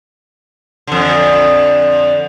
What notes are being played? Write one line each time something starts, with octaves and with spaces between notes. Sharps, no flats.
F2 D3